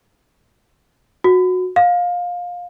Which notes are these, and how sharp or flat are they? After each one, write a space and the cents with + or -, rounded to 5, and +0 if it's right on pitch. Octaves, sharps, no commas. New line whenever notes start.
F#4 -15
F5 +20